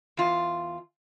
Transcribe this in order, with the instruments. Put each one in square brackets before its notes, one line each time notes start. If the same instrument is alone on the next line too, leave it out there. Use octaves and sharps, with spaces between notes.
[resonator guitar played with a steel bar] E2 F4